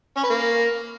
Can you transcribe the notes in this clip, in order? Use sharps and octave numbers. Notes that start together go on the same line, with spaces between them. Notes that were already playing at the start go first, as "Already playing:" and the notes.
C#4
B4
A#3